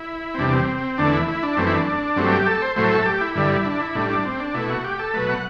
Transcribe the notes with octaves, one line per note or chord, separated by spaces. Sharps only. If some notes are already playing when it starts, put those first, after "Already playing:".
Already playing: E4
C4
E2 C3 G3 D4
D4
C4
E2 D3 A3 D4
E4
E4
D4
F#2 E3 A3 C4
E4
D4
G2 F#3 A3 C4
G4
A4
C5
A2 F#3 A3 C5
A4
G4
E4
G2 D3 G3
D4
E4
A2 G3 D4
D4
C4
D4
B2 A3 E4
F#4
G4
A4
B2 F#3 A3 B4
F#5